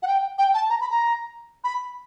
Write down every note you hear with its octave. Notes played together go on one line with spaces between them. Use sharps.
F#5
G5
G5
A5
A#5
B5
A#5
B5